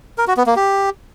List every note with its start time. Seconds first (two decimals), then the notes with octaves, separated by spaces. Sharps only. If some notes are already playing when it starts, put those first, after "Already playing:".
0.18 A#4
0.28 F#4
0.37 B3
0.47 A#3
0.56 G4